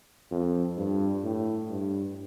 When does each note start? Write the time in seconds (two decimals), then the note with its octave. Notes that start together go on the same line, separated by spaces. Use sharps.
0.31 F2
0.77 G2
1.23 A2
1.69 G2